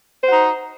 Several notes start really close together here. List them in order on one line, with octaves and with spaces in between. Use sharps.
C5 F#4 D#4